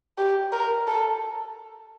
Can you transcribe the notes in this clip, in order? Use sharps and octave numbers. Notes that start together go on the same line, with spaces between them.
G4
A#4
A4